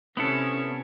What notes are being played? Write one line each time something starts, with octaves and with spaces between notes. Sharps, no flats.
C3 B3 C#4 E4 A4